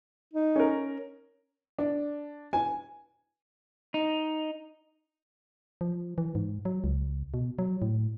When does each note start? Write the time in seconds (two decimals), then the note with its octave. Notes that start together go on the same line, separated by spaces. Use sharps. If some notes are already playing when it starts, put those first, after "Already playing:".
0.34 D#4
0.56 C#4 A#4
1.79 D4
2.53 G#5
3.94 D#4
5.81 F3
6.18 E3
6.35 G#2
6.65 F#3
6.84 C#2
7.34 B2
7.59 F#3
7.82 A2